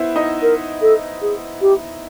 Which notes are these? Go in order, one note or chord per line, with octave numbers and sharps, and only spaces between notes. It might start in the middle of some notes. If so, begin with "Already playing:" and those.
Already playing: B3 E4 C5 E5
D#4 D#5
A#4
A4
G#4
G4